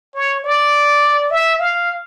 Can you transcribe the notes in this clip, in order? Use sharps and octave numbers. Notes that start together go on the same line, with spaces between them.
C#5
D5
E5
F5